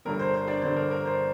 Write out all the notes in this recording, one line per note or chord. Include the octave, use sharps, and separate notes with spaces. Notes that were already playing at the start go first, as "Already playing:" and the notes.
G1 G2 D3 A#4
C5
C5
D4 D5
G1 G2 D3 C5
A#4
A#4
C5